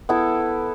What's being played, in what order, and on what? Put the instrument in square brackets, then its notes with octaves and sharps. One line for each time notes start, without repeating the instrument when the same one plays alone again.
[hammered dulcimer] B3 E4 A4